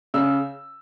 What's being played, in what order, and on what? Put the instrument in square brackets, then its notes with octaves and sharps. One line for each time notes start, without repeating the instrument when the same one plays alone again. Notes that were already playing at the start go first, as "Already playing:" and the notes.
[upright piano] C#3 E6